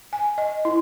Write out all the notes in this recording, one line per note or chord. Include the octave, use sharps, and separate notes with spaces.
G#5
D#5
E4